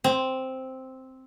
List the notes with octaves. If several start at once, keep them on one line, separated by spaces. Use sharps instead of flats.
C4